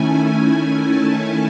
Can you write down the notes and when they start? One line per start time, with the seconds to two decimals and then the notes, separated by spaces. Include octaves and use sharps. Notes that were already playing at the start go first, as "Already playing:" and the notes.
Already playing: D#3 A3 C#4 E4 G#5
0.81 A5